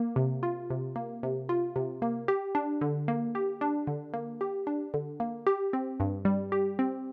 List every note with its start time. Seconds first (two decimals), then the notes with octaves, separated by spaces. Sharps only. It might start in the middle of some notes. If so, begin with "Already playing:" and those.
Already playing: A#3
0.16 C3
0.43 F4
0.70 C3
0.96 A#3
1.23 C3
1.49 F4
1.76 C3
2.02 A#3
2.28 G4
2.55 D4
2.81 D3
3.08 A#3
3.35 G4
3.61 D4
3.87 D3
4.14 A#3
4.41 G4
4.67 D4
4.94 D3
5.20 A#3
5.47 G4
5.73 C4
6.00 G2
6.25 G3
6.52 G4
6.79 C4